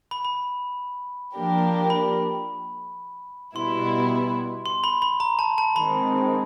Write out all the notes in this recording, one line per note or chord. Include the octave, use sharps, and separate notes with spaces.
B5
B5
F3 A#3 D4 G4 A#4
B5
B2 G3 B3 E4 C6
C6
B5
B5
A#5
A5
A5
D#3 G#3 C4 B5